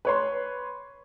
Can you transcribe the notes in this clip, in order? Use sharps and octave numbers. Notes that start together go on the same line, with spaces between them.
B4 C#5 C6